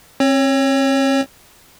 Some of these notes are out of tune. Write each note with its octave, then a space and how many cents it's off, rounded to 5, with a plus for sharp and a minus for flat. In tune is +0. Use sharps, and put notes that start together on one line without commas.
C4 +40 C#5 +0